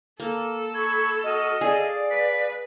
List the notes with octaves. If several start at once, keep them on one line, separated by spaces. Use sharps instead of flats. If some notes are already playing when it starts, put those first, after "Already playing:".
A#3 A4
B5 C#6 G#6
F#4 D#5 F6
G#4 D5 F5
B4 B6